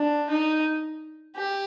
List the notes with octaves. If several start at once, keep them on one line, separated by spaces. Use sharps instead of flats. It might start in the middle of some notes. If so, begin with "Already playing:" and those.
Already playing: D4
D#4
G4